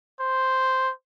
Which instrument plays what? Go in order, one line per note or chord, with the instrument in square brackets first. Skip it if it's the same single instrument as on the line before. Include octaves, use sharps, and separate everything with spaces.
[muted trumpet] C5